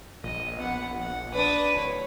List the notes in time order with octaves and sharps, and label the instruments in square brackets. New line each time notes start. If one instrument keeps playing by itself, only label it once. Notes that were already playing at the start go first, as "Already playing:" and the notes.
[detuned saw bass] A#1 [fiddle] D#5
[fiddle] B3 F#5
F#5
[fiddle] D4 D#6 [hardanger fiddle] B4
[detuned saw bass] D1 [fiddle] C#5